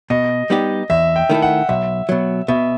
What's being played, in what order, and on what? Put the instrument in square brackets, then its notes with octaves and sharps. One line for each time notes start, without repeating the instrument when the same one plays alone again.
[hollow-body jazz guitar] B2 [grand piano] D#5
[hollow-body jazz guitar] G3 B3 D#4 G4
[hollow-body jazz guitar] E2 [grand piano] E5
[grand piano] G5
[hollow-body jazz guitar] D#3 A3 E4 A4
[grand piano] F#5
[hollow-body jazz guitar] B1 [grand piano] E5
[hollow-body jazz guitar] B2 F#3
[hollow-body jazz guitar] B2 [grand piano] E5